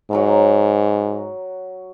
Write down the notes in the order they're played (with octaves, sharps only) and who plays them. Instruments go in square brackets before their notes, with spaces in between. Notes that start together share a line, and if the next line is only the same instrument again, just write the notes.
[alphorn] G#2 [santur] F#3 A#5 E6